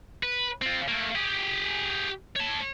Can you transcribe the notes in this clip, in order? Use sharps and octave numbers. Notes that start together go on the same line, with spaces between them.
B4
C4 F4
A3 A#3
G4 G#4
C#5 A5